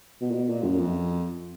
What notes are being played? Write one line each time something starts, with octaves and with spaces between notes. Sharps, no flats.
B2
A#2
B2
A#2
F#2
F2